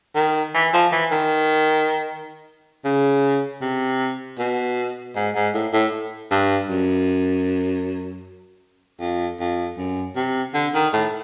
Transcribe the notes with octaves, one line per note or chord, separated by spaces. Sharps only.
D#3
E3
F3
E3
D#3
C#3
C3
B2
G#2
G#2
A2
A2
G2
F#2
F2
F2
F#2
C3
D3
D#3
A2